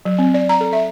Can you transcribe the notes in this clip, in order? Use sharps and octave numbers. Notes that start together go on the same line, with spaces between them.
F#3
C4
D5
A#5
A4
E5